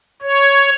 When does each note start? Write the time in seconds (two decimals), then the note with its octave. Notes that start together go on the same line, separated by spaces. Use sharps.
0.22 C#5